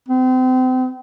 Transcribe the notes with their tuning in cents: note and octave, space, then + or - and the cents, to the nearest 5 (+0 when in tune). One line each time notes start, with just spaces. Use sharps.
C4 -35